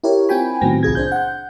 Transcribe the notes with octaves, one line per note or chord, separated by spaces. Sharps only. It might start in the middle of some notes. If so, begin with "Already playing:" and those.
E4 G4 A#4 C#5
C4 E4 F4 G5 G#5 B5
A2 D#3 F#3 B3 C4 A#6
C2 F4 G#4 G#6
D4 C5 G6
F#5 G6